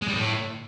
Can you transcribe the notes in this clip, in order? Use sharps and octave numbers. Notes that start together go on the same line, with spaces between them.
G#3
G3
A2